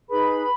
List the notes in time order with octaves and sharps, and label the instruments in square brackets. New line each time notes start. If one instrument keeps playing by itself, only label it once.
[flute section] D#4 G#4 B4 B5